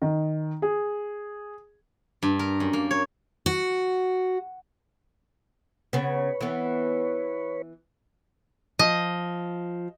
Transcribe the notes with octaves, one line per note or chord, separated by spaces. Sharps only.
D#3
G#4
G2
A#4
F#2
A#3
C#5
F#4
C#3 B3 B4 C#5
E3 B3
F3 D#5